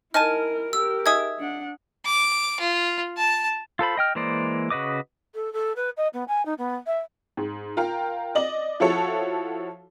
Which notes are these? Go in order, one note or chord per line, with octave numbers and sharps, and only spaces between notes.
D#4 E4 A#4 G#5 A5 F6 D#7
G4 A#4 E6
D#4 G#4 E5 D#6 G#6
D4 F#5
D6
F4
A5
F4 A4 C5 B5
D#5 G5 F6
E3 G#3 A#3 C5 D5
C#3 F#4 B4 D#5 D6
A4
A4
B4
D#5
B3
G#5
D#4
B3
E5
G#2
F4 A#4 F5 G5
D5 D#5 F#7
F3 E4 F#4 A4 C#5